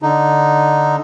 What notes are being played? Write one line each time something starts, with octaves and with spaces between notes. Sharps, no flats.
D3 D#4